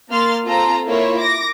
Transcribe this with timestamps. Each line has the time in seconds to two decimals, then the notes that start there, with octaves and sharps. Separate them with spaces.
0.10 A#3 C6 F6 A6
0.46 C4 F4 A4 A#5
0.87 A#3 E4 F4 A#4 C#5
1.20 D6 A#6